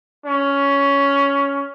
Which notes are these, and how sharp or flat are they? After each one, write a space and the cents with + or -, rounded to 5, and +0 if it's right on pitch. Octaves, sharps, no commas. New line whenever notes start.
C#4 +10